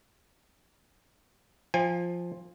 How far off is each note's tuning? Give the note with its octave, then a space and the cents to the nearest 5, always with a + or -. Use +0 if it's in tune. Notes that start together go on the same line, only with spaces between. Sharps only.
F3 +0 G#5 -35